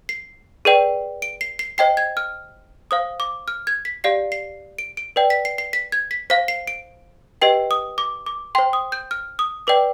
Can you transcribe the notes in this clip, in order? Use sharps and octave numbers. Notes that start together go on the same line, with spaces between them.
C7
G#4 B4 D5 G5
D7
C7
C7
C5 D#5 G5 C7
G#6
F6
C5 F5 D#6
D6
F6
G#6
B6
G4 D5 F5 C7
C7
D7
D7
B4 D5 G5
B6
C7
C7
B6
G#6
B6
C5 F5 B6
C7
D7
G4 B4 D#5 G5 C7
D#6
D6
D6
C5 G5 C6
D#6
G6
F6
D#6
B4 D5 G5 D6